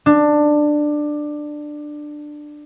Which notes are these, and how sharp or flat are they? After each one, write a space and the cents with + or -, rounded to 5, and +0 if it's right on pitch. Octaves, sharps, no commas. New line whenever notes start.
D4 +15